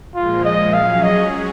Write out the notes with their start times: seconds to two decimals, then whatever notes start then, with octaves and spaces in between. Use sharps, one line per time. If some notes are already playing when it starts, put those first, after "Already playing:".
0.15 A#2 F3 G#3 F4
0.45 D#5
0.73 F#3 C#4 G#4 F5
1.03 D#5